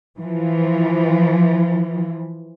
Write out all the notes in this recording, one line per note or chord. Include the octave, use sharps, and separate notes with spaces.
E3 F3